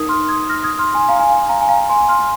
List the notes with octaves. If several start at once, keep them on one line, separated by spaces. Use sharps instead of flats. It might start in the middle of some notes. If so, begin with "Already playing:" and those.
Already playing: D#4 A#4 D#6 G#6
C6 F6
D#6 G#6
F6 A#6
D#6 G#6
C6 F6
G#5 C6
F5 A#5
G#5
F5
F5 A#5
G#5
F5 A#5
G#5 C6
C6 F6